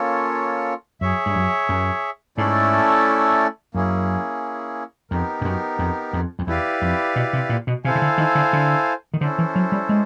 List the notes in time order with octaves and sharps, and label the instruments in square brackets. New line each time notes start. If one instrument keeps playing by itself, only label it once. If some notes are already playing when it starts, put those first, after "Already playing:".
Already playing: [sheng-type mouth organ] A#3 C#4 F4 A4 C#5
[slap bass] F#2 [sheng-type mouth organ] G#4 C#5 E5
[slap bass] G2
F#2
F#2
[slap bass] G#2 [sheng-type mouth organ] A3 C#4 E4 A4 D5
[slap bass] F#2 [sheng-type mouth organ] A#3 C#4 E4 G#4
[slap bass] F2 [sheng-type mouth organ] B3 D#4 G4 A#4
[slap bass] G2
F#2
F2
F2
F2
[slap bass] E2 [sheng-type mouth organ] E4 G4 B4 D5 F5
[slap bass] F2
B2
C3
A#2
B2
[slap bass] C3 [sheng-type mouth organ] E4 A4 C5 F5 G#5
[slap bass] C#3
D3
D#3
D3
D3
D#3
[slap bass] D3 [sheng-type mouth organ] C#4 E4 A4 C5
[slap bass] E3
F#3
G3
G#3